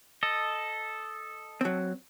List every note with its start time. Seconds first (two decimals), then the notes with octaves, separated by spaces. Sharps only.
0.23 A4 D#5
1.61 F#3 C4